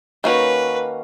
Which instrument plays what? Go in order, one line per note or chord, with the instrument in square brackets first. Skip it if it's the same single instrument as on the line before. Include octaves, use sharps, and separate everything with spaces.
[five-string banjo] D#3 A#3 C#4 F#4 [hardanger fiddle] B4